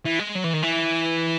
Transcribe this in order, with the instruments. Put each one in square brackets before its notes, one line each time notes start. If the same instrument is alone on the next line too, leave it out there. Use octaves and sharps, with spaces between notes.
[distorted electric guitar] E3
G#3
F#3
E3
D#3
E3